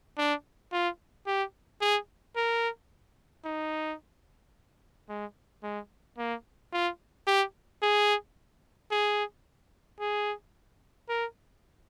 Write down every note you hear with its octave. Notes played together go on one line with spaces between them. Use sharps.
D4
F4
G4
G#4
A#4
D#4
G#3
G#3
A#3
F4
G4
G#4
G#4
G#4
A#4